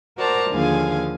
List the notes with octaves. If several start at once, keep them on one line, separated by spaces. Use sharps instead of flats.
F#4 A#4 C5 D5 A5 A#5
D#2 D3 F3 G#4 F5 G#5